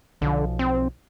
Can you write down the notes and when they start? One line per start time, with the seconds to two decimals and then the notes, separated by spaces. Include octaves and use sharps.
0.22 B1 D3 F3
0.59 C4